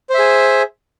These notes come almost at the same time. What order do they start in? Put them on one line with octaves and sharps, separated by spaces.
C5 E5 G#4